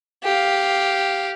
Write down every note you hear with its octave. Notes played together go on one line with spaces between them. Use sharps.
G4 F5